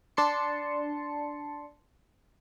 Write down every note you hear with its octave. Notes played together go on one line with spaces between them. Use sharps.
D4 A5 C6 C#7